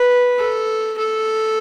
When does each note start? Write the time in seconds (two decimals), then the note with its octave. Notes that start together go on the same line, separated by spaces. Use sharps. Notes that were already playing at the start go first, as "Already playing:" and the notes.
Already playing: B4
0.38 A4
0.98 A4